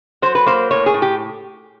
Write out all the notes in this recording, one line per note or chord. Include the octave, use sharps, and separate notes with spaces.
F#3 C5
B4
A#3 C5
A2 C#5
G#4
A2
G4